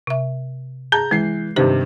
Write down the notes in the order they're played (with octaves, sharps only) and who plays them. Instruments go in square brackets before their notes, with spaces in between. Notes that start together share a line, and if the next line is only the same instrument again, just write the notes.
[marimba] C3 E5
[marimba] G#4 [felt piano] A5 A#5 G6
[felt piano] E3 C7 [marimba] G#3
[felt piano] G2 C3 D#3 [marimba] G4 C5